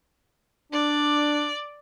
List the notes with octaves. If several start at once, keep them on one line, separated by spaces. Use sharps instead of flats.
D4 D5